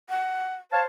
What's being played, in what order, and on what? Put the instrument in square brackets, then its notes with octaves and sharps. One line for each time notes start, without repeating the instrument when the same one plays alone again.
[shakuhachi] F#5
[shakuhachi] C5 [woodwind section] C#5 F5 A5